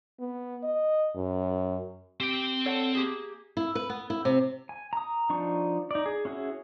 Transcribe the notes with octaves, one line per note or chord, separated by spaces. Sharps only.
B3
D#5
F#2
C4 G4 G5
A4 C#5 F#5
A#3 G4 G#4
E4
B4
B3
E4
C3
G#5
A#5 D#6
F3 D4 D#4 C#6
D#4 D5
G#4
C#4 E4 F#4 G#4